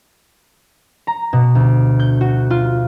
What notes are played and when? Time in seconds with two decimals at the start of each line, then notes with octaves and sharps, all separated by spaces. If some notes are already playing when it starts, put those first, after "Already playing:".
1.07 A#5
1.33 B2
1.55 D2
2.00 G6
2.21 F#4
2.50 F4